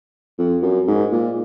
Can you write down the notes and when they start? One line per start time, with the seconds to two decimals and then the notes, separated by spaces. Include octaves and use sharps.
0.39 F2
0.62 F#2
0.87 G#2
1.12 A#2